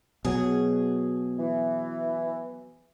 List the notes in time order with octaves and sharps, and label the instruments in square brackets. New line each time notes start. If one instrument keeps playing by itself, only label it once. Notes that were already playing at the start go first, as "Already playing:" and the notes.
[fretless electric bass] B2 F#3 [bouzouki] G#4
[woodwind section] E3